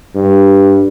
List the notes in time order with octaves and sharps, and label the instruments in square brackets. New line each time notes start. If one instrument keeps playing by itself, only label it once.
[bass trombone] G2